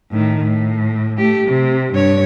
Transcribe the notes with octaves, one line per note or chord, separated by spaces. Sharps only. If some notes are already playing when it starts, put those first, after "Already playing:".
A2 D#3
A2
A3 G4
C3
G2 C#5